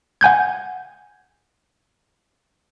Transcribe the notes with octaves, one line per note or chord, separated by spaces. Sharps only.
F#5 G#5 G6 G#6